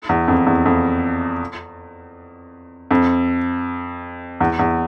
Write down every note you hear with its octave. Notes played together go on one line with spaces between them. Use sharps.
E2
F2
E2
F2
F2
E2
E2